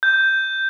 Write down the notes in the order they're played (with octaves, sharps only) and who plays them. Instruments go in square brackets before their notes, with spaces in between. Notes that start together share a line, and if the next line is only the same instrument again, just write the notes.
[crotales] G6